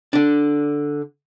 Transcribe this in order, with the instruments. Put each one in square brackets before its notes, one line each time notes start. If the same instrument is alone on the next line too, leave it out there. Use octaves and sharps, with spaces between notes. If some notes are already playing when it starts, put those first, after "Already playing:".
[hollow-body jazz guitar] D3 D4